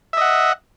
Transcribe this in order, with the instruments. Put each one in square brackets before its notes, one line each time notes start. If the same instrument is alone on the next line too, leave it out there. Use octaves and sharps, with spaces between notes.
[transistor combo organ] E5
D#5
F#5